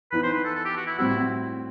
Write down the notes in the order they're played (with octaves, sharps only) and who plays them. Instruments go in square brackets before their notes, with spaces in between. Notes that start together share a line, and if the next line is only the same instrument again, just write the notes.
[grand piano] E3 B3 D#4 [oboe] B4
[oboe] C5
B4
A4
A4
G4
F#4
E4
[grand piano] A2 G3 C4 F#4 [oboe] E4